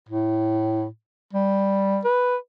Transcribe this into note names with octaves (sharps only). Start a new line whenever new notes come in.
A2
G3
B4